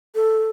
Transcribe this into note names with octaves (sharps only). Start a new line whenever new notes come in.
A4